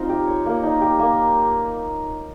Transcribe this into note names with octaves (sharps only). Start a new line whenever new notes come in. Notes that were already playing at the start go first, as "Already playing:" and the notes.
Already playing: C4 D#4 F4
G4
C#5
A#3
D#4
G4
A#3